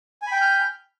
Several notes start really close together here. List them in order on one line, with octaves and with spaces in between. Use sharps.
G#5 B5 G5 G6 F6